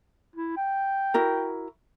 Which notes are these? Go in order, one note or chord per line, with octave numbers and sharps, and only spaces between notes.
E4
G5
E4 F#4 A#4